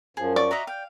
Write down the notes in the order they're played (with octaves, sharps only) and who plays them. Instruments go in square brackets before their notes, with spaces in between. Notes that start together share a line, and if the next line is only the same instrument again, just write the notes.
[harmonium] F#2 F3 [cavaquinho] G#4
[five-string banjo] D5 [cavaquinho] C#6
[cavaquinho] F#4 C#5 D#5 [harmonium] E5 A#5
[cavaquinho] F5 [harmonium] G5